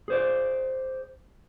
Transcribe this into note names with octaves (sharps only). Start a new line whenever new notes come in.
G#4 C5 D5